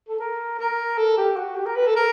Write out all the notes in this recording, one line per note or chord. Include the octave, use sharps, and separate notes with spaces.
A4
A#4
A#4
A4
G4
F#4
G4
A#4
B4
A4
A#4